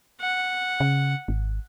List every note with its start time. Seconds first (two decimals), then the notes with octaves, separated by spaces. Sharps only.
0.21 F#5
0.80 C#3
1.28 G#1